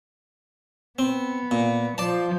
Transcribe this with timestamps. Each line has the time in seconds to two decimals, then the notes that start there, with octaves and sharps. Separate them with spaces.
0.99 B3 C4
1.51 A#2
1.98 F3 D5 A5